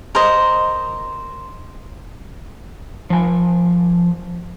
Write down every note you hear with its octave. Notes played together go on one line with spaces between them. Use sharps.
A#4 C5 D#5
F3 G#5